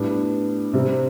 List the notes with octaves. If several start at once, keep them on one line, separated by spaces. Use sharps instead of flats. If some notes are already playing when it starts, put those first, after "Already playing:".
Already playing: A2 G3 B3 D4
C3 G3 C4